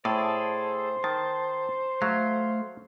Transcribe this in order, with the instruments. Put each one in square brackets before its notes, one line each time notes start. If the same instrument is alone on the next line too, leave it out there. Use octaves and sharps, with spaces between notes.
[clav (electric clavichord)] A2 [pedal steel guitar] G#4 A4 D5 [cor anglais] C5
[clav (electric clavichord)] D#3 [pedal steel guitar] A5
[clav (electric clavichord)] F#3 [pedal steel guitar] A3 F5